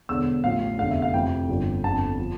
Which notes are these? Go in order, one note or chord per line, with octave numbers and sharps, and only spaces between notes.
E1 E2 D3 E6
A1 A2 F3 F5
F1 E2 D3 F5
E5
F5
F1 F2 E3 G5
G1 G2 D3 F3
G1 F2 D3 A5
F3